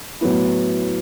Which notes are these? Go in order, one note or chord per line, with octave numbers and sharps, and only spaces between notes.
A2 F#3 B3 E4